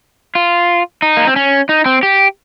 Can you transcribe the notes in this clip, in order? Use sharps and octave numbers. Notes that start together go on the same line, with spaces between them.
F4
D#4
A#3
C4
C#4
D#4
C4
G4